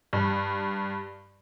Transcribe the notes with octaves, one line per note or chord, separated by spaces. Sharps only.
G2